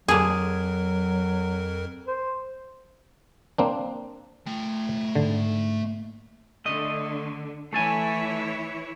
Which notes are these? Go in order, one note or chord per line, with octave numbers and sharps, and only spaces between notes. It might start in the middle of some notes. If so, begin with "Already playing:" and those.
F2 D3 F#3 G#4 A#4
C5
A#3 C4 D4
A3 G5
G#2 D3
D3 A3 D#5
E3 A3 E4 A4 C#5 G#5